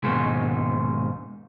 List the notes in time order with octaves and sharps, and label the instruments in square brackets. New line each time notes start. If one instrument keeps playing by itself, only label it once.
[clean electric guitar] D#2 G#2 B2 D#3 G#3